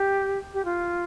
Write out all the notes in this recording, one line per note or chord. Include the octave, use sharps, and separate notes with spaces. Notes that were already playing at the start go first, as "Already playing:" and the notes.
Already playing: G4
G4
F4